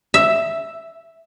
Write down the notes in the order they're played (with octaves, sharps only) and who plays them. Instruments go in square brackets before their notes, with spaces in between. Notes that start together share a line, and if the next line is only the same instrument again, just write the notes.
[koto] E5